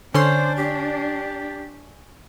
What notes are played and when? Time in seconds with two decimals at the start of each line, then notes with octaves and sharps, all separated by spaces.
0.14 D3 C#4 D4 C5 C6
0.57 G4